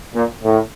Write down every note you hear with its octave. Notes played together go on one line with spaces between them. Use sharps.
A#2
A2